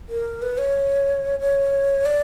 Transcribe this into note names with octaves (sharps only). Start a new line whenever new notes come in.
A#4
B4
C#5
C#5
D5